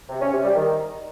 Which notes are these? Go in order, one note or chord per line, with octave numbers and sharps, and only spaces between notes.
C3
C#4
C3
G3
D#3